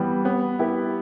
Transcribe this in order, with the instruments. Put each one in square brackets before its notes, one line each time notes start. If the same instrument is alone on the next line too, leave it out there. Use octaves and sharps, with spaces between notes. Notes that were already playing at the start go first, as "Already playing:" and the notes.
Already playing: [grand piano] E3 G3 B3
B3
E4 G4 B4